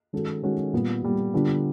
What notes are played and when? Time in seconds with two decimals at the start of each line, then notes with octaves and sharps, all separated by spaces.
0.13 D#3 G#3 C#4 F#4 A4
0.43 D#3 G#3 C#4 F#4 A4
0.73 A#2 G3 B3
1.03 A#2 G3 B3
1.34 D3 G3 B3 D4 F4